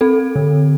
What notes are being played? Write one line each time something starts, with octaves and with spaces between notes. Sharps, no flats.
C4 A4
D3